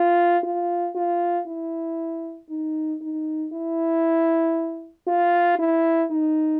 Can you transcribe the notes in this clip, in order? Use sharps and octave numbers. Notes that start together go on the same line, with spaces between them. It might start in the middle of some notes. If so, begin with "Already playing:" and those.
Already playing: F4
F4
F4
E4
D#4
D#4
E4
F4
E4
D#4